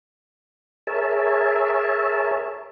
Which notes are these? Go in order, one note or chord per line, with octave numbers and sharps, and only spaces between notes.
G#4 A#4 C#5 E5 A5